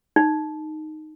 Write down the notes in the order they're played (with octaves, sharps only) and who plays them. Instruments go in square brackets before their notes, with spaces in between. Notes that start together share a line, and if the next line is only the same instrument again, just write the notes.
[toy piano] D#4